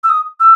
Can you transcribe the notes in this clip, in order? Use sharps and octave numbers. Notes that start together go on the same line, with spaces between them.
E6
D#6
E6